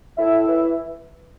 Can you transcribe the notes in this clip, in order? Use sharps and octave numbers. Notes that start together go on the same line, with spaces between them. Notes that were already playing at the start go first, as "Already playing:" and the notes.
A2 E4 E5
E3